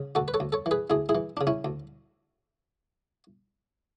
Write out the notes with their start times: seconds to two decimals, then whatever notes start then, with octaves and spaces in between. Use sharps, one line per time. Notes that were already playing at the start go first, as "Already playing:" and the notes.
Already playing: C#3
0.15 D2 F#4 A4
0.28 B4
0.34 A4 C#5
0.40 D2
0.52 A4 C#5
0.66 E3
0.71 G#4 B4
0.90 D2 E4 G#4
1.09 E4 G#4
1.15 E3
1.37 C#3 D4
1.47 C#4 E4
1.65 D2